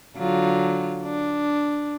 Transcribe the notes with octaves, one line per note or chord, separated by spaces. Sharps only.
D3 F#3 F4
D4